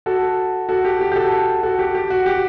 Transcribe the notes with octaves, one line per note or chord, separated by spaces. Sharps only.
F#4 A4
F#4 A4
G4
G4
G4
F#4 A4
F#4 A4
G4
G4
F#4
G4